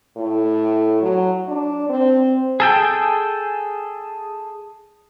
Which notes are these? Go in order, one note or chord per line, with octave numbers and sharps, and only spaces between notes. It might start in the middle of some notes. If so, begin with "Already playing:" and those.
A2
F#3
D4
C4
G#4 A4 G5